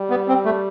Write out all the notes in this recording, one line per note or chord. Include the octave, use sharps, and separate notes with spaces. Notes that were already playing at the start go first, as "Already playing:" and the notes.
Already playing: G3
B3
C4
A3